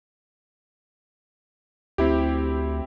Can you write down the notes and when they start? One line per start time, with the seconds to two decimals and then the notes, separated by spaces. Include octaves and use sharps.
1.98 D2 C4 E4 G4